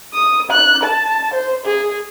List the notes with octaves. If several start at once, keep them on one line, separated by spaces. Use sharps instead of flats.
D#6
F#6
A5
C5
G#4